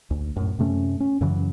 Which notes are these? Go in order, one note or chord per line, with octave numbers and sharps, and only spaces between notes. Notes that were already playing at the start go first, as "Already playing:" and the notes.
D2
F#2 A2
F#2 C3 A3 C#4
C#4
F#2 C#3 E3 F#3